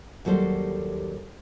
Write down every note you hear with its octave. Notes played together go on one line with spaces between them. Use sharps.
D#2 F#3 G3 A4 C5